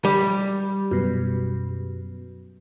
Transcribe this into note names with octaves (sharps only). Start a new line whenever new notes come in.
G3
F#2 B2